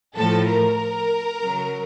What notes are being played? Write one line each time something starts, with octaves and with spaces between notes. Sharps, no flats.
A2 F3 A4
A#4
C#3 F#3